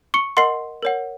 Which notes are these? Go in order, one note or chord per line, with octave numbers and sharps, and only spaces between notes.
C#6 C#7
A#4 D#5 F#5 C6 C7
A#4 C#5 F#5